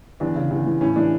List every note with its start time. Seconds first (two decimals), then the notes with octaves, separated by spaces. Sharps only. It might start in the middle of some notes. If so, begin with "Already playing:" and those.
0.20 E2 D4
0.36 C#3
0.51 E2
0.66 E3
0.81 A2 C#4
0.96 E3 D4